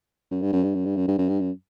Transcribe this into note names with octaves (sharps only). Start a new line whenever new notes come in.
F#2
G2
F#2
G2
F#2
G2
F#2
G2
F#2
G2
F#2